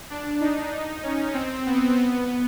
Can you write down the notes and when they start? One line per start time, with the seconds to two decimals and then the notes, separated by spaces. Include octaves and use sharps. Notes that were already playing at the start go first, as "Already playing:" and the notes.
0.10 D4
0.41 D#4
0.73 D#4
1.03 C#4
1.34 C4
1.66 B3
1.96 B3